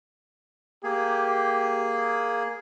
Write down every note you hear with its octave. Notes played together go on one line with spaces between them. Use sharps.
A#3 G4 G#4